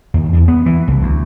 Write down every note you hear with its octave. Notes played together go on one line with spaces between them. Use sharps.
D#2
E2
B3
E3
C2
D2